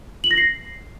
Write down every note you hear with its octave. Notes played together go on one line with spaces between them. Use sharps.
F#7
A#6
C7